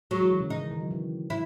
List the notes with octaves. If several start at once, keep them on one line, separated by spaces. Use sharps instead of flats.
F#3 G#3
E3
D#3
C#3
E3 D#4
D#3
D#3
F#3
E3
E4